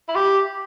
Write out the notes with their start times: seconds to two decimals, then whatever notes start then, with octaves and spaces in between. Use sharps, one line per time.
0.08 E4
0.15 G4